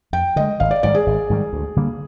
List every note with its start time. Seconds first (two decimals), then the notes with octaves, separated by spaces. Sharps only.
0.13 F2 G5
0.36 D3 G#3 D#5
0.60 G#1 F5
0.71 D5
0.83 G#2 D#3 G3 D5
0.95 G#4
1.06 G#1
1.30 G#2 D#3 G3
1.53 D2
1.76 D3 G3 A#3